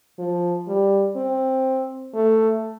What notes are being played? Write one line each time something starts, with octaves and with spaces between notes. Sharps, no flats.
F3
G3
C4
A3